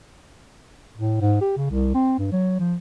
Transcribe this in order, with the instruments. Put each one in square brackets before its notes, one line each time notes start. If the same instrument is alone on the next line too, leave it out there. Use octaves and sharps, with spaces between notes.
[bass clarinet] A2
G#2
G4
C#3
C2
C4
G2
F#3
F3